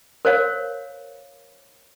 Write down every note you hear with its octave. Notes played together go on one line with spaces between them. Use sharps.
A#4 C5 C#5 F5